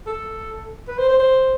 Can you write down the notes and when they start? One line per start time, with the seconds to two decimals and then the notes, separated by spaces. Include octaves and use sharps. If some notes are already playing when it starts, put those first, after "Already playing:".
0.07 A4
0.88 B4
0.98 C5
1.09 C5
1.19 C5